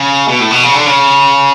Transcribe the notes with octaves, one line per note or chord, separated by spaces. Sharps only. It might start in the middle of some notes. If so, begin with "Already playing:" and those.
Already playing: C#3
B2
A2
B2
C#3
D3
C#3